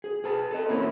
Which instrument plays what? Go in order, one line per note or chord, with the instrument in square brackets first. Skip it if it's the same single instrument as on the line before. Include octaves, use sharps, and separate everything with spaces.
[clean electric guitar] G#4
G#4 B4 A5
A4 D#5
A#3 C4 C#4 E4 A#4